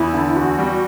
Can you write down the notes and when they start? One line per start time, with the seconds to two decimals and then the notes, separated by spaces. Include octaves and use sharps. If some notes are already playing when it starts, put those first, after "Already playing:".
Already playing: E2 E4
0.14 D3
0.36 E2 F#4
0.59 G3